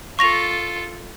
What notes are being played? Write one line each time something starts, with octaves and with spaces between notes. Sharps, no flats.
F4 A4 C#6 A#6 F7